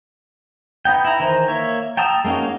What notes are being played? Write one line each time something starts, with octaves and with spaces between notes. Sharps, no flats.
B3 D#4 G5
E4 A#5
D#3 E3 C5 A#5
A#3 C#5 E5
G5 A5 A#5 D#6 E6
G#3 A#3 C#4 D#4 F#4